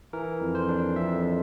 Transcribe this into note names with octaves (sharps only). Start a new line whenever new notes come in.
E3 A#4
F2
C5
D4
F2 E5